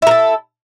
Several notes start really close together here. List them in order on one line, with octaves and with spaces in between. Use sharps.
E4 A#4 A4